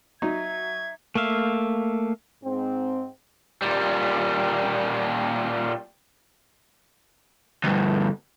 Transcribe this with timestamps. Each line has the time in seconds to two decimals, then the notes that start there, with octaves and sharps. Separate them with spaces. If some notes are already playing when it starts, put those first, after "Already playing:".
0.22 F#3 D#4 E5 G#6
1.15 A3 A#3 E5 F5
2.44 G#2 C4
3.62 A#2 G3
7.64 D2 G2